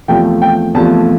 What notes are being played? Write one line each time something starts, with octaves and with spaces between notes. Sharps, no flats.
E2 C3 F3 A3 G5
G5
E2 C3 F3 A3 A5